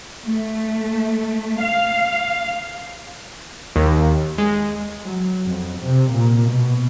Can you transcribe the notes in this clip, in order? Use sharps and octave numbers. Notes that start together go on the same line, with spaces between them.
A3
F5
D#2
G#3
F#3
F2
C3
A#2
B2